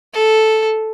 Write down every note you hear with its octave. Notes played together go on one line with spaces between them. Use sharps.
A4